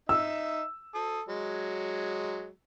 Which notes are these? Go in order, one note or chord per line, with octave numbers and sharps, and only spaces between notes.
D#4 E5 E6
A4 D#6
F#3 G#3